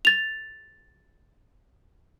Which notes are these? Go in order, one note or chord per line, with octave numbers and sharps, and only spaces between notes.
A6 F7